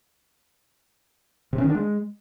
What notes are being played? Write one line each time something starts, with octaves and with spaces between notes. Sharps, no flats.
C3
C#4
D#3
D4
G#3